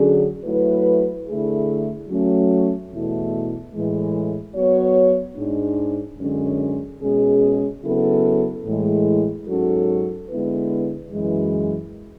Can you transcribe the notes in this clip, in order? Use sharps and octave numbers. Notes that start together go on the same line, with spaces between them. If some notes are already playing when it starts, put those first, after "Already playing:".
Already playing: D3 F#3 C#4 G#4
F#3 A3 E4 B4
D3 A3 E4 G#4
F#3 A3 C#4
E2 B2 A3 E4
A2 E3 G#3
F#3 B3 F#4 C#5
G#2 G#3 D4
F#2 D3 G#3 C#4
B2 G#3 C#4 G#4
C#3 F#3 B3 E4 A4
A2 E3 G#3
G#2 F#3 C#4 F#4 A4
D3 G#3 B3 E4 B4
F#2 E3 G#3